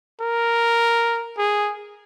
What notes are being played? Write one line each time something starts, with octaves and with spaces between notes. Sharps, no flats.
A#4
G#4